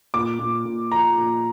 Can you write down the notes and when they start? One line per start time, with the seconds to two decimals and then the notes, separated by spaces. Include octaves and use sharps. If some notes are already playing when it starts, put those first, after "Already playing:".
0.14 A#2 D6
0.39 A#2
0.65 A#2
0.92 F3 A#5
1.18 A#2